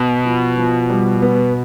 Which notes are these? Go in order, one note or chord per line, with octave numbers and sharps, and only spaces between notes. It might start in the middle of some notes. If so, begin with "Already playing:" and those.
Already playing: B2
F3
F3
G3
B3